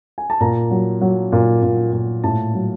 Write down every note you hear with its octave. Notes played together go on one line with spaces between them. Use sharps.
G#5
A5
A#2 A#5
F#3
F#3
A#2
A#2
A#2
A2 A5
F#3